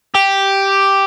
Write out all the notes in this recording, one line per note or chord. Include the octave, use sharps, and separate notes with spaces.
G4